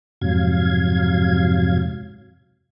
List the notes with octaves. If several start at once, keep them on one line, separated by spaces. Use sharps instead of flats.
F2 G#2 C3 F#3 F5 G#6